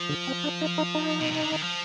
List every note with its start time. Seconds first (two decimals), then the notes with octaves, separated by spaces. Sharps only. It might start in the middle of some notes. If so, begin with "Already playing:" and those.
Already playing: F3
0.09 D3
0.27 C4
0.44 D4
0.61 D#4
0.78 D#4
0.95 D#4
1.21 B2
1.31 C3
1.41 D3
1.52 D#3
1.63 F3